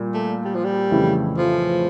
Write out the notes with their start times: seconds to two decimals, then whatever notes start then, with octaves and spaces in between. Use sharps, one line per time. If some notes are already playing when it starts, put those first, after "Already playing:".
Already playing: A#2 G3
0.14 A3
0.45 G3
0.55 F3
0.65 G3
0.91 F2 C#3 E3 A3 E4
1.38 F3